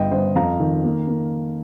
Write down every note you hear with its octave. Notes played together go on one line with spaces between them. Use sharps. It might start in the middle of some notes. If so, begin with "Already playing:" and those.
Already playing: G1 D#5 G5
G1 C5
F2 F5 A#5
D#3
A#3
A#3